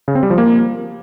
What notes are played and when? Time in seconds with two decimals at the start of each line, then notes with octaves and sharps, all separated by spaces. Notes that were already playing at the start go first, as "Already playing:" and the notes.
0.08 C#3
0.15 C4
0.23 G3
0.30 F3
0.38 A#3